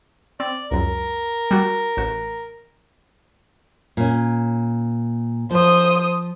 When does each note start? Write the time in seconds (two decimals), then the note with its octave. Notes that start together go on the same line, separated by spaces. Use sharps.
0.40 C4 D5
0.71 C#2 F#2 A#4
1.51 G3 F#4
1.97 A1 F#4
3.97 A#2 C#4
5.51 F3 C5 D#6